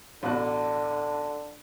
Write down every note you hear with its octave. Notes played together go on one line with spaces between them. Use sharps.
A1 B2 D3 F#6